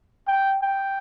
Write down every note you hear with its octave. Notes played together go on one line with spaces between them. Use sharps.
G5
G5